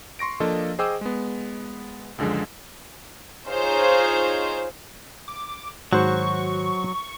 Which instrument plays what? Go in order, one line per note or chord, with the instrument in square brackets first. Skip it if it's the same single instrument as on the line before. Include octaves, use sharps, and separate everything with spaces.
[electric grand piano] C6 C#6 A#6 D7
F3 A#3 D4 A4 A#4 D#5
G#4 C5 D#5 G5 D6 E6
G#3 B3
C#2 F#2 D3 F3 G#3
[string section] D#4 F4 G#4 C5 C#5
[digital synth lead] D6
[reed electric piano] G#2 D#3 [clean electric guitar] F#3 [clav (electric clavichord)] F#4 C5 [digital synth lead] C#6